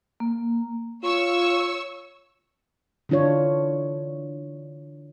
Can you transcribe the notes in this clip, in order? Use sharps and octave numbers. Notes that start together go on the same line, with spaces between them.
A#3
F4 C#5 C#6 E6
D3 E3 D4 F4 C#5